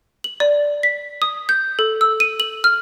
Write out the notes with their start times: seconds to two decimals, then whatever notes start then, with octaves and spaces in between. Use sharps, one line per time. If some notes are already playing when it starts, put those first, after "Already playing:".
0.24 F#7
0.40 D5
0.83 B6
1.22 D#6
1.49 G6
1.79 A4
2.01 E6
2.20 D#7
2.40 F#7
2.64 F6